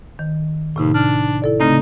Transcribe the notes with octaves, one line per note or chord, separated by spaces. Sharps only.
D#3
D#2 A2 C3 D#4
D4 F6
E4 A4 D5
C#3 A3 C4 D#4